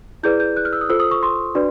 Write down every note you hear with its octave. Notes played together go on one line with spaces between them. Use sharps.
E4 G#4 B4 D5 G6
G6
F#6
F6
E6
D#6
F4 A4 C5 E6
D#6
C#6
C6
D4 F#4 B4 D5